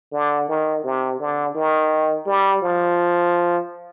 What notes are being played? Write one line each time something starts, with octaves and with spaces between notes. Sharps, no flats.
D3
D#3
C3
D3
D#3
G3
F3